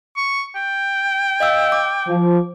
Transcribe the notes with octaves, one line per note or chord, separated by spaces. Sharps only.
C#6
G5
D#5 F5 E6
D6
F3